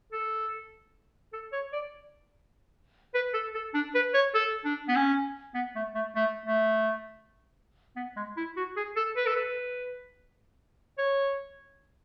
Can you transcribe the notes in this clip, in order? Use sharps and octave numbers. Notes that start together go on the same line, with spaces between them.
A4
A4
C#5
D5
B4
A4
A4
D4
B4
C#5
A4
D4
B3
C#4
B3
A3
A3
A3
A3
B3
G#3
E4
F#4
G#4
A4
B4
A4
B4
C#5